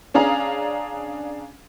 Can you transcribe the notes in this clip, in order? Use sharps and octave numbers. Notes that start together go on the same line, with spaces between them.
C#4 D4 G#4 F5 A#5